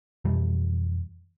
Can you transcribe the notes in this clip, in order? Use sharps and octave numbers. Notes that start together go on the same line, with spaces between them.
F2 B2 E3 G3